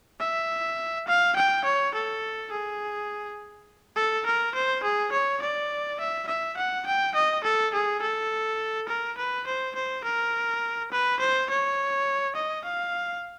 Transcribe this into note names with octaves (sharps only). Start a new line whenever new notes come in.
E5
F5
G5
C#5
A4
G#4
A4
A#4
C5
G#4
C#5
D5
E5
E5
F#5
G5
D#5
A4
G#4
A4
A#4
B4
C5
C5
A#4
B4
C5
C#5
D#5
F5